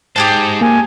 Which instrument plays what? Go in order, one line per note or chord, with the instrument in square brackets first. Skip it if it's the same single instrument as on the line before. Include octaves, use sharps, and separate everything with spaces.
[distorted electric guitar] G#2 C5 [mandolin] G4 G#4 A5
[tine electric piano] A#3 [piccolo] G#5